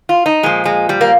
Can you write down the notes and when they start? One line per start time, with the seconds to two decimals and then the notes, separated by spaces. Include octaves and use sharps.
0.09 F4
0.26 D#4
0.43 A#2 F3 G#3
0.65 G#3
0.89 G3
1.01 A#3